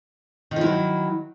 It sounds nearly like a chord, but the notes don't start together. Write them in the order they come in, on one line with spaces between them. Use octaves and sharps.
D#3 F3 E4 F#3